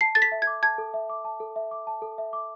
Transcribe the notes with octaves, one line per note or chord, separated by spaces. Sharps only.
A5 C7
A4 A6
B6
E5
G#6
D6
A5 G#6
A4
E5
D6
A5
A4
E5
D6
A5
A4
E5
D6